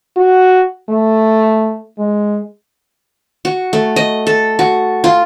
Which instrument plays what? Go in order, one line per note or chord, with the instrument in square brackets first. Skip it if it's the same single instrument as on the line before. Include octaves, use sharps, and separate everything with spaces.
[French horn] F#4
A3
G#3
[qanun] F#4
A3
D#5
A4
F#4
F4